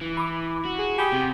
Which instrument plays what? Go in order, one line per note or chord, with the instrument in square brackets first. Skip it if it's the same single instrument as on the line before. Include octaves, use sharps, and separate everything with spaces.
[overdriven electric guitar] E3
[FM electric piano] B5 D6
[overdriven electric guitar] F#4
[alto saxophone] G#4
[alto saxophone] G4 [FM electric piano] G#5 B5 D#6
[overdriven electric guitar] C3